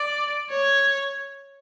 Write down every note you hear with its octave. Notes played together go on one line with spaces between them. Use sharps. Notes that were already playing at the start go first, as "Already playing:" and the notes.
Already playing: D5
C#5